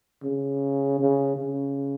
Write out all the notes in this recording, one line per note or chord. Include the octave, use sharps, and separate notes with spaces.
C#3
C#3
C#3